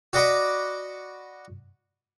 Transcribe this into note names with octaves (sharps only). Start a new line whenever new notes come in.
F#4 D5 D#5 F#5 B5 D6